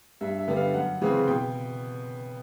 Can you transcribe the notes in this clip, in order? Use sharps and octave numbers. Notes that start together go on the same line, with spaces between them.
G2 E5
E5
D3 G3 B3
F5
F#2 F#5
C#3 E3 G#3 C4
B2 G5